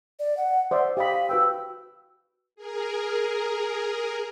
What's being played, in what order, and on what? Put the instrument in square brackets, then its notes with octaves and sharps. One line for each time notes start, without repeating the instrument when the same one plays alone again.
[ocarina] D5
F#5
[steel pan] C5 D5 E5 [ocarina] F#5
[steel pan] G4 D#5 B5 [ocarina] F5
[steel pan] F#4 B4 G5 [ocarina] E6
[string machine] G#4 A#4